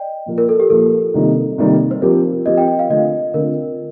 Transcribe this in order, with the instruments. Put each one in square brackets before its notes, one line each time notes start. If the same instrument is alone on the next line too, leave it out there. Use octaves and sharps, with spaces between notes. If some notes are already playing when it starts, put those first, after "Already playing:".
Already playing: [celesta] D5 D#5 G5
[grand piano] A#2 F3 A#3 F4
[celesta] A#4
A4
G4
[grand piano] A#2 F3 A#3 F4 [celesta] A4
[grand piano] C3 D#3 G3 A#3 D#4
C3 D#3 G3 A#3 D#4
[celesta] C5
[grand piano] F3 C4 G4 [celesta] A#4
[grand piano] F3 C4 G4 [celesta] D#5
[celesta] G5
G5
F5
[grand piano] D3 A3 C4 F4 [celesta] D#5
[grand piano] D3 A3 C4 F4 [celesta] A#4